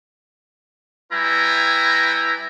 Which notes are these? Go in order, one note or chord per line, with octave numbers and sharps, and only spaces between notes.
G3 E4 B4 G5 G#5 A#5